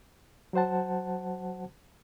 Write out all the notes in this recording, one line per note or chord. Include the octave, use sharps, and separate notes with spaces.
F#3 F#4 C5 F#5 A5